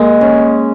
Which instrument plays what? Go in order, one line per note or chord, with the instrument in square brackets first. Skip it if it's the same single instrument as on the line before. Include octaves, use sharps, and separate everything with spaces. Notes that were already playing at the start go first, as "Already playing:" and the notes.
Already playing: [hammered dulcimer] G#3 [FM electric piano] A#3
[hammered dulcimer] C#4